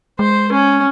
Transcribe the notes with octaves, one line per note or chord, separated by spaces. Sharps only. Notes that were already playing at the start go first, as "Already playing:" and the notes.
G#3 C5
C#4